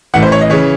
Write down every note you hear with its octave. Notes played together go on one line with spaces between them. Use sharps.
A1 A2 E3 F#5
C5
C#5
D#5
C#3 E3 C#5